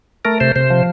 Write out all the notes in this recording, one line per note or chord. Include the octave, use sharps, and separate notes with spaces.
A3 A#4
C3 C5
C3 C5
F3